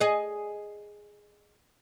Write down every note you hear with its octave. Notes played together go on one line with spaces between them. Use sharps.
G#4 D#5